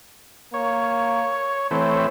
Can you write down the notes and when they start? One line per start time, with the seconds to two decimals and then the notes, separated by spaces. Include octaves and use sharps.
0.54 A#3 C#5
1.71 E3 A3 C4 C#5